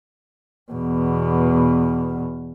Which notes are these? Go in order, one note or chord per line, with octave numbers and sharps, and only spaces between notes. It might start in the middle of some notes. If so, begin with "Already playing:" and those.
E2 B2